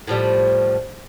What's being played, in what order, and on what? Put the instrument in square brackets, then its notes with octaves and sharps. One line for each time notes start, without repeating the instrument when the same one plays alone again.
[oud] A2 F3 G3